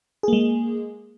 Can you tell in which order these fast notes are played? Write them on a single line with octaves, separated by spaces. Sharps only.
G#4 A#3 G#3